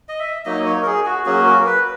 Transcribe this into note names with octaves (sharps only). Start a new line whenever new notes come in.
D#5
E5
F#3 A#3 D#4 D#5
C#5
A#4
G#4
F#4
F#3 A#3 C#4 F#4 G#4
A#4
B4